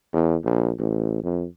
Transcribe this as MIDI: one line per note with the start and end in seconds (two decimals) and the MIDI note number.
0.13 0.36 40
0.45 0.72 34
0.79 1.23 33
1.23 1.45 41